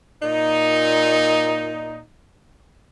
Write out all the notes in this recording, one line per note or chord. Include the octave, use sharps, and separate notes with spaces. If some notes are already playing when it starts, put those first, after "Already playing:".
A#2 D#4